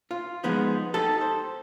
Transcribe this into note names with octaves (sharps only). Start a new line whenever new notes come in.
F4
F3 G#3 B3 D#4
D#4 G4 A4
C5